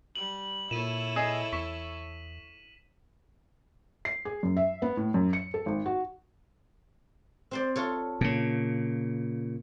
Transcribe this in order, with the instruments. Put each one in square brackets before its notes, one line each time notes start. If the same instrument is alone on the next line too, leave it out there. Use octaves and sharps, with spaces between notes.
[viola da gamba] G3 [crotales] F#7
[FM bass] A#2 [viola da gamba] E4 A4 C#5 [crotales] D#7 E7
[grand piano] G#4 D#5
[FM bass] E2 [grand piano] C#6 [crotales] B6
[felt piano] C7
G#4
F#2
E5
B3
A2
F#2
C#7
A4
G#1
F#4
[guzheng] C4 C5 D5
F4 A4 C#5
[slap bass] A#2 C#3